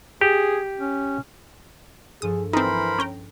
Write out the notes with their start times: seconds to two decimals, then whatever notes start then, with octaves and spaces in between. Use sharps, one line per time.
0.21 G4 G#4
0.79 C#4
2.22 G2 F3 G#4 A4 D#6
2.53 E3 C4 D#4 E4 A#4 C5 B5
2.99 C#4 G5 A#5